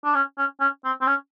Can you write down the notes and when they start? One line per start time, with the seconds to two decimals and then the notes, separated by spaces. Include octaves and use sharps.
0.05 D4
0.14 C#4
0.38 C#4
0.60 C#4
0.85 C4
1.01 C4
1.07 C#4